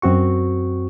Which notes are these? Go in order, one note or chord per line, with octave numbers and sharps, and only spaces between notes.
F#2 C4 F#4 C#6